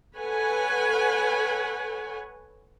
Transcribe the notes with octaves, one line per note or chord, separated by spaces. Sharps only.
A4 B4 C#5 F#5 G#5